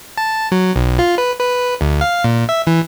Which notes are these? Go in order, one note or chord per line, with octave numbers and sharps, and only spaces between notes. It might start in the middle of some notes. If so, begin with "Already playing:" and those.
A5
F#3
B1
F4
B4
B4
D2
F5
A#2
E5
E3